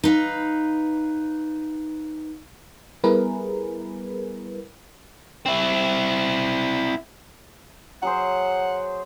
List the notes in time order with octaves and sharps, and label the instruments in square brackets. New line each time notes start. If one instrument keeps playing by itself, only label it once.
[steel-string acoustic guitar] D#4 B4 F5
[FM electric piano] G3 B3 E4 G#4 A#4 B4
[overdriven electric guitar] C4 E4
[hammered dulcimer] F#3 G#4 C5 [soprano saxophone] F#5